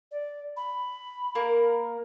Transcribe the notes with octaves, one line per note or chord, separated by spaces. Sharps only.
D5
B5
A#3 A#4